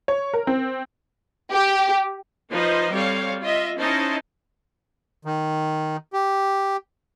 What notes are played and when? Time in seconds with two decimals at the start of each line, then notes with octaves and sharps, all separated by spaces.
0.08 C#5
0.33 A#4
0.47 C4
1.52 G4
2.50 F3 D#4 B4 C5 D#5
2.93 G3 C4 A4 C#5 F5
3.42 F4 D#5 E5
3.78 C#4 D#4 E4 C5 D#5 A5
5.25 D#3
6.13 G4